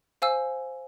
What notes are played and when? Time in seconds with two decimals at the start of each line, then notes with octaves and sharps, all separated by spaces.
0.22 C5 F5 G#5 E6